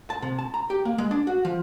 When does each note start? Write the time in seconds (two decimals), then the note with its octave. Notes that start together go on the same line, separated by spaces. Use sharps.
0.10 A5
0.22 C3
0.39 A5
0.54 A#5
0.70 G4
0.85 A#3
0.98 G#3
1.11 D4
1.27 F#4
1.45 F3